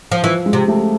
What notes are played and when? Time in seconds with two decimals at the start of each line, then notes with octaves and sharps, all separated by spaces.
0.12 F3
0.24 E3 F3
0.46 G#3
0.53 C3
0.68 A3